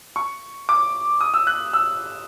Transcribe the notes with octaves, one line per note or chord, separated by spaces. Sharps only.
C#6
D6
D#6
E6
F#6
E6